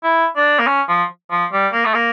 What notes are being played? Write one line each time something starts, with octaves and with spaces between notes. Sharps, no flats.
E4
D4
A#3
C#4
F3
F3
G3
A#3
A3
A#3